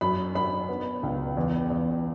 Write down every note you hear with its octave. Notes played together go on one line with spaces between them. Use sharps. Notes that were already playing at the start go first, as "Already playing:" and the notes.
F#2 B5
F#2 B5
B3
C#2
E2
E2